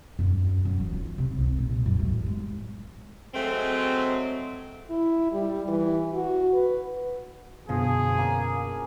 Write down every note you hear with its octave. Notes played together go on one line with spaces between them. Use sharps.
F#2
F#2
E3
F4
C3
C2
A#2
F#2
A1
G#3
F#3 G#3 A3 C4
E4
G3
E3
F#4
B4
F#2 B2 D3 F3 G#4
A#3 C#4 G#5